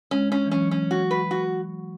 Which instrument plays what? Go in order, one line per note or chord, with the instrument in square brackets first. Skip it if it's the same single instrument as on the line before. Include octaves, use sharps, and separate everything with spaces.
[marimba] G#3 [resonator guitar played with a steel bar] C#4
[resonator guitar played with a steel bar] C#4
[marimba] E3
[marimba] F#3 [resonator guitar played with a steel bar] C#4
[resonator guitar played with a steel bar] C#4
F#4
B4
F#4